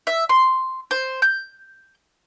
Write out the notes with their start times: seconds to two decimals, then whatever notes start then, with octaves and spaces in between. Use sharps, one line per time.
0.07 E5
0.29 C6
0.91 C5
1.22 G6